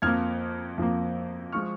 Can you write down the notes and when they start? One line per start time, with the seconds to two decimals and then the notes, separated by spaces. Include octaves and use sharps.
0.02 F2 F3 A#3 F6 G#6
0.78 F2 F3 A#3
1.52 F3 G#3 C#6 F6